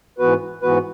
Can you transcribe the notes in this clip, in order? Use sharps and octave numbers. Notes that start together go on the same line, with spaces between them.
G#2 E3 B3 F#4 B4
G#2 E3 B3 F#4 B4